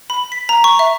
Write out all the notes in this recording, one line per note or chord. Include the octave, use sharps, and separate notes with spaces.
B5
B6
A#5
C#6
E5